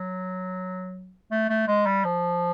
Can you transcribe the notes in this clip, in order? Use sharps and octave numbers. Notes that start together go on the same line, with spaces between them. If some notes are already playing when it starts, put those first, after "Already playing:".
Already playing: F#3
A3
A3
G#3
G3
F3